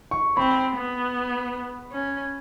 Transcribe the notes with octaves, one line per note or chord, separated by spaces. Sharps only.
C#6
C4 B5
B3
C#4